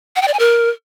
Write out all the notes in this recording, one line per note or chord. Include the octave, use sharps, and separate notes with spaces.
F#5
G5
D5
G#5
A#4